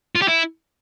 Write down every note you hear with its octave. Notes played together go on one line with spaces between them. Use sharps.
F4
G4
E4